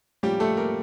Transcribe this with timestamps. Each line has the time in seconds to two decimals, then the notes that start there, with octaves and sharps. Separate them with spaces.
0.23 A2 F3 G3 A#3 C#4 G4
0.40 A3 A4
0.57 A#3 A#4